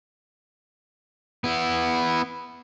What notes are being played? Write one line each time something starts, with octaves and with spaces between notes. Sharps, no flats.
B3 E4